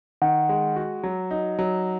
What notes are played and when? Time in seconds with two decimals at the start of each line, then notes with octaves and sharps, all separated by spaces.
0.22 D#3 F#5
0.49 G#3
0.76 F#4
1.03 F#3
1.31 D#4
1.59 F#3